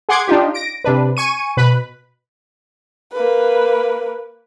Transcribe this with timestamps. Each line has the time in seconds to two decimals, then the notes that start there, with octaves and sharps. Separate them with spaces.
0.09 G#4 F#5 C6 D6 G#6
0.28 D4 D#4 F4 G4
0.54 A#6 D7
0.84 C3 D4 B4
1.17 G#5 C#6 D#7
1.57 B2 B4 B5
3.13 A#3 B4